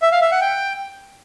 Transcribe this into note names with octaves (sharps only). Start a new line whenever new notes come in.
E5
F5
E5
F#5
G5